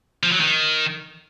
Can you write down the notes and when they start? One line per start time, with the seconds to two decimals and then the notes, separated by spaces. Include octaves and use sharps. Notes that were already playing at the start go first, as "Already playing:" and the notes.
0.23 F3
0.32 F#3
0.40 D#3